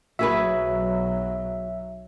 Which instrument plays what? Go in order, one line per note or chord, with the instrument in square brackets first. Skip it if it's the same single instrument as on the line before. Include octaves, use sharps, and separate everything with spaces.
[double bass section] B1 F#3 [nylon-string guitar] F#4 G#4 B4 [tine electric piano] E5